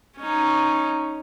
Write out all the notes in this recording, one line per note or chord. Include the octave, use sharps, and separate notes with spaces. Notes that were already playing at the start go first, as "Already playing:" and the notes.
C#4 D#4